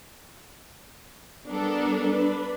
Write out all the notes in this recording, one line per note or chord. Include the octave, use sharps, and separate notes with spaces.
G3 B3 D4 A4 A#4
D4 B4